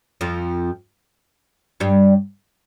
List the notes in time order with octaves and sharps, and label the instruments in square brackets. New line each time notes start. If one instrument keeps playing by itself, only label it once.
[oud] F2 F3
G2 G3